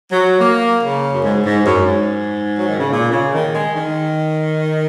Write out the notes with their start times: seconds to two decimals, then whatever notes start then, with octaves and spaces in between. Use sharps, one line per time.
0.12 F#3
0.40 A#3
0.82 C#3
1.13 F#2
1.23 G#2
1.45 G#2
1.66 F#2
1.86 G#2
2.57 F#3
2.69 D#3
2.80 C#3
2.92 A#2
3.12 C#3
3.33 D#3
3.54 G#3
3.76 D#3